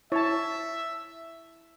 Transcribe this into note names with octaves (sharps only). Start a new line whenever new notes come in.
E4 C#5 E5 A5